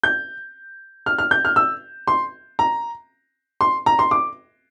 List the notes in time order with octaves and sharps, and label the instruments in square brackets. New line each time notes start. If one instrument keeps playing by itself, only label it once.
[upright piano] G6
F6
F6
G6
F6
E6
C6
A#5
C6
A#5
C6
D6